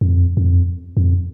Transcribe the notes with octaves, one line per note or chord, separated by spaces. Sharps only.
F2
F2
F2